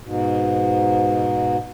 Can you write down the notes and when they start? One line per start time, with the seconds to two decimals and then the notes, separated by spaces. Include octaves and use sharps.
0.03 G#2 B2